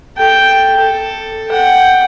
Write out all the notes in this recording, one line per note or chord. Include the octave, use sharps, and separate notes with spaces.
A4 G5
A4
F#5 G5